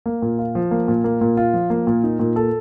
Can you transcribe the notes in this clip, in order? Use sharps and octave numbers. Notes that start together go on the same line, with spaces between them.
A#3
A#2
F4
F3
A#3
A#2
A#3
A#2
F4
F3
A#3
A#2
D#4
A#2
A4